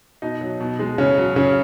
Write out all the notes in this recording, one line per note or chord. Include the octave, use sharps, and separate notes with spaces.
B2 D#4
F#3
B2
G#3
C#3 C#4
F#3
C#3 C#4